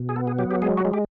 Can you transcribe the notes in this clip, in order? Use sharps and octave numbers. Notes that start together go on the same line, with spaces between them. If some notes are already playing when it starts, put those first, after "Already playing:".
Already playing: B2
G#4
B3 A4
G#4
F#3 G4
G4
G#3 G#4
F#4
G#3
G4